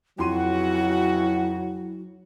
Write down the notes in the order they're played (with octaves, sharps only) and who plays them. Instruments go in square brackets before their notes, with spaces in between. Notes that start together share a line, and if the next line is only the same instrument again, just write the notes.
[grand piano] F2 C6 D#7 [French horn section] C#3 E3 F#4 [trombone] F#3 [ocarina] E4